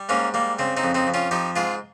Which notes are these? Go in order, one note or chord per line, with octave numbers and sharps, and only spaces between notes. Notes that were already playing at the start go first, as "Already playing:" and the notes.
Already playing: G3
G#2 A#3 C#4
G3 A#3
C#3 C4
C4 D#4
F2
C4 D#4
F2
C#4 F4
F3 D#4 G4
G#2 F4 G#4